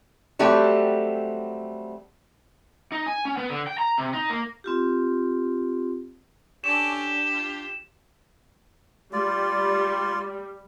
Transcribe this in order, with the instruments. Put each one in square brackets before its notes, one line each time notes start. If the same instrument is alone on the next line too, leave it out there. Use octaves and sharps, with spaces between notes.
[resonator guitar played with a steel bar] F#3 G3 A3 C4 G4
[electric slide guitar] D#4
G#5
C#4
B3
D3
G5
A#5
C3
D#4
A#3
[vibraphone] C4 F4 G4
[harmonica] C#4 A4 D5 [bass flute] D4 [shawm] G4 [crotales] E7
[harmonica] F4
[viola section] G3 [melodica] F4 D5